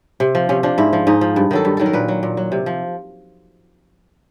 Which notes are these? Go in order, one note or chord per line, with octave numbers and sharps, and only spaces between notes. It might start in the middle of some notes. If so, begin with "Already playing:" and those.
C3
F3
C3 C#4
F3 D4
G#2 E4
F3
G#2 D#4
F3
G2
D#3 F#3 A4
G2
D#3 F#3 A4
A#4
A#2 B4
F#3
A#2
F#3
C3
F3